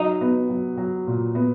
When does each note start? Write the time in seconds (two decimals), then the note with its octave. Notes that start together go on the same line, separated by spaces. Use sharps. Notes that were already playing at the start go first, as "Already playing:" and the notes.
Already playing: F#3 D#4
0.21 B3
0.49 F#3
0.77 F#3
1.07 A#2
1.35 B3